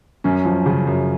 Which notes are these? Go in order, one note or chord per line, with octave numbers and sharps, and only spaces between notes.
F#2 C#4
F3
C#3
F#2